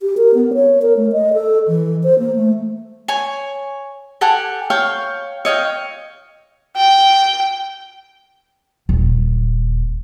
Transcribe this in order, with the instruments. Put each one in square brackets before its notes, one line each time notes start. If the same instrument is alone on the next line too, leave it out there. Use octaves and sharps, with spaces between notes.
[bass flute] G4
A#4
B3
C#5
A#4
A3
D#5
A4
E3
C5
A#3
A3
[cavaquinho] C#5 G#5
G4 A4 F#5 G#5
C#5 F5 G5 C#6
C#5 D#5 F5 G5
[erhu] G5
[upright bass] D#1